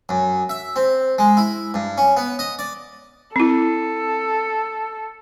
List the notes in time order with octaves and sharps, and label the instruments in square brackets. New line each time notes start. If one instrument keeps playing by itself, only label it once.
[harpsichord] F#2
E5
C4
G#3
E4
G2
C#4
B3
D#5
D5
[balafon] C4 E4 [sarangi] A4